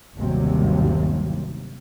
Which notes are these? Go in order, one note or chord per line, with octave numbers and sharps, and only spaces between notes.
G1 D#2 C3 F#3 G3